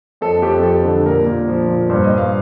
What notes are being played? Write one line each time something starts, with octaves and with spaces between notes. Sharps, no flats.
F2 A4
F2 G4
F2 A4
D3
A#2 A#4
A#2
F3
A#2
G2 C5
D#5
G2
F5